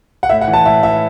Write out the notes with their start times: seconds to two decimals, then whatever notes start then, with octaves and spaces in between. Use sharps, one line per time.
0.23 F#5
0.29 A2 E5
0.41 F#5
0.48 E3
0.53 A5
0.65 A2 E5
0.83 E3 E5